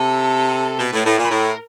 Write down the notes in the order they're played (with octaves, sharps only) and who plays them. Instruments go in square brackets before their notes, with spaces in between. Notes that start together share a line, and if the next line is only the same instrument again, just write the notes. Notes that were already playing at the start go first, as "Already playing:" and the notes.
Already playing: [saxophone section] C3 [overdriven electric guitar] A4
[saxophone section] B2 [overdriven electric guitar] B4
[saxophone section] A2
A2
A#2
[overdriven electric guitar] B4
[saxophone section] A2 [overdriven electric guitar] A#4